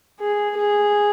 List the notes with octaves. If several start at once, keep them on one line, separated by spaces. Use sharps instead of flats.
G#4
G#4